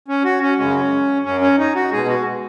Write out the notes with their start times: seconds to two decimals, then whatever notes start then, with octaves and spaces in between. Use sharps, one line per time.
0.08 C#4
0.24 F#4
0.42 C#4
0.58 F#2 C#3 G#3 C#4
1.24 F#2 F#3 C#4
1.41 C#4
1.58 D#4
1.75 F#4
1.92 B2 G#3 G#4
2.08 F#4